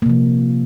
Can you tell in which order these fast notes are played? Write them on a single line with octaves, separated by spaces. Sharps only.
A#3 C3 F3